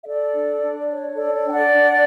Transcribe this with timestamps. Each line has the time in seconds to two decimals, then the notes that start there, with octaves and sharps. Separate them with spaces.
0.02 E5
0.07 A4 D5
0.34 D4
0.62 D4
0.89 C#5
1.16 A4 D5
1.35 D5
1.44 D4 G5
1.53 D5 F#5
1.71 D4